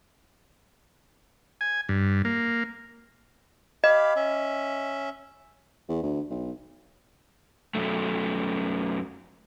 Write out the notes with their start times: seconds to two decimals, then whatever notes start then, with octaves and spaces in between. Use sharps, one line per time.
1.61 G#5
1.89 G2
2.25 A#3
3.84 G4 D#5 F5 B5
4.16 C#4 E5
5.89 E2
6.03 D2
6.30 B1
7.75 F#2 A3